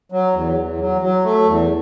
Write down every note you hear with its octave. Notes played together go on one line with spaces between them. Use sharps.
F#3
E2
E2
F#3
F#3
A3
E2